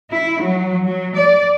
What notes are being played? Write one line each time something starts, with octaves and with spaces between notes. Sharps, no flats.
E4
F#3
F#3
D5